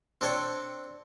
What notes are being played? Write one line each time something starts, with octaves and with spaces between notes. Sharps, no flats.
C4 D4 A4 C#5 G5